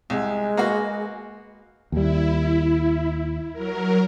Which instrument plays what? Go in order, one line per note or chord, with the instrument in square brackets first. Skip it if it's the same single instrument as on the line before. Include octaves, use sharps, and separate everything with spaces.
[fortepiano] C2 [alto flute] G#3
[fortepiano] A#3 B3 F#4
[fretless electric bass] D#2 G3 [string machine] E4
[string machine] F#3 A#4